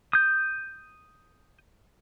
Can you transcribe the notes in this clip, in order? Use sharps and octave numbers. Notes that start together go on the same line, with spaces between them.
D#6 G6